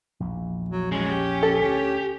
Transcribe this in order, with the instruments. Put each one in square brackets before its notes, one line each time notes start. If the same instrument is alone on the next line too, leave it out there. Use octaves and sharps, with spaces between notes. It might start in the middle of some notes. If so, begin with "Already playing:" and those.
[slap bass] A#1 E2
[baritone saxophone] F#3
[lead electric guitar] F#3 G#3 [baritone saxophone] C#4
[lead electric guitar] G4
[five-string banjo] A4
[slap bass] D2 [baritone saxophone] C#4